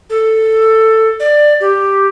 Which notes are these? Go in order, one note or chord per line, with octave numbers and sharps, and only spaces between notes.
A4
D5
G4